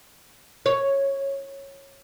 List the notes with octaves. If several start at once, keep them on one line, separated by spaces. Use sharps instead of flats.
C#5